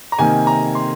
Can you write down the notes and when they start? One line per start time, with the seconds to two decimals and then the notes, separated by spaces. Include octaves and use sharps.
0.12 A#5
0.19 C3 D#3 A#3 G#5
0.47 A#5
0.75 C6